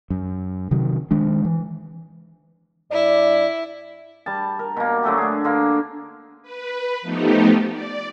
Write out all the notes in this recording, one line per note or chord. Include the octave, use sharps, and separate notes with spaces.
F#2
C3 D#3 F#3
D#3 G#3 D4
E3
G2 E4 D5
G3 A5
A#4
B2 A#3
D3 F#3 A3 G4
D4 G#4
D3 A#3
B4
F3 A3 B3 D#4 G4
D5